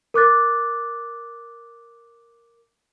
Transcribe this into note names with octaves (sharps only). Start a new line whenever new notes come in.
A#4 D6 F#6 A6